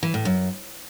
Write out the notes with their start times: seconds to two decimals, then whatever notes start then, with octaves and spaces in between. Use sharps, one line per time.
0.03 E3
0.14 A2
0.25 F#2